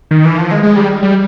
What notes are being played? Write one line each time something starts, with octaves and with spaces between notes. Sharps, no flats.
D#3
E3
F3
G#3
G#3
G3
G3